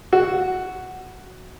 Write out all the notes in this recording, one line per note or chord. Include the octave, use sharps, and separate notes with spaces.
F#4